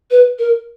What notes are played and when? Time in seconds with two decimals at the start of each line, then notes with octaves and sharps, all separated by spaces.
0.11 B4
0.39 A#4